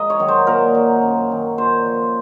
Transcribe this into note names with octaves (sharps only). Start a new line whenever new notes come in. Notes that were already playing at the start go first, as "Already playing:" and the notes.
Already playing: G#2 F3 A#4 D#5
C#5
D#3 F#3
C5
A#2 A#4
F#3
F#2
D#3 F#3
A#2 C5
F3